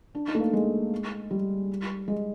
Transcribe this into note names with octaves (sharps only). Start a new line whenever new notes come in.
D4
D#4
A3
A#3
G#3
G3
G#3